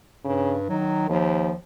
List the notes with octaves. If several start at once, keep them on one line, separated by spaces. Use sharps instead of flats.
G2 C#3
D#3 F#3
D#2 F3